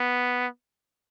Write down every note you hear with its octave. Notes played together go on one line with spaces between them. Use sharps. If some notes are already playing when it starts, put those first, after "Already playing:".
Already playing: B3